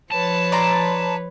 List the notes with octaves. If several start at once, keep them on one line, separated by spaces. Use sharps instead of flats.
F3 B4 C#5 A5
D5 A#5 C6